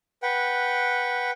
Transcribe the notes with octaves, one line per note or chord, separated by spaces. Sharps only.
B4 F#5 G5